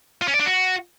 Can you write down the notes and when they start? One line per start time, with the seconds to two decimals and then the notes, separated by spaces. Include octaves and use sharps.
0.22 F4
0.28 C#4
0.34 D5
0.40 D4
0.46 F#4